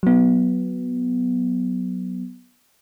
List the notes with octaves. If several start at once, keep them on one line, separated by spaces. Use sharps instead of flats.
F#3 B3